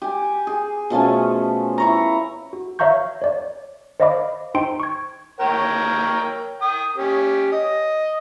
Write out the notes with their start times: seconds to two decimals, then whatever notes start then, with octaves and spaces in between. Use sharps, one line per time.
0.02 G4 G#5
0.47 G#4
0.90 B2 F3 A3 C#4
1.78 E4 C#5 A#5
2.53 F#4
2.79 C#5 E5 F5 A#5 C#6 G6
3.22 C#5 D5
4.00 C5 D5 D#5 F5 B5 D6
4.55 D#4 C5 G5 C6 D7
4.80 C#6 G#6
5.40 A#4 C#5 G5
6.61 G5 D#6
6.97 C#4 G4
7.52 D#5